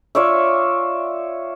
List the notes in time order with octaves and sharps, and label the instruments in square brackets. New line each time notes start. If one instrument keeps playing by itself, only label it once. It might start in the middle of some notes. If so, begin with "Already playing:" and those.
[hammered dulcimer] F4 C#5 D5 E5